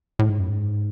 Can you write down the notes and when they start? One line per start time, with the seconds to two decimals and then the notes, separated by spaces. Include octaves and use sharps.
0.19 A2
0.29 G#2
0.40 F#2
0.50 G#2